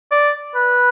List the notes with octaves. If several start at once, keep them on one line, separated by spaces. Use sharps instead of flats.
D5
B4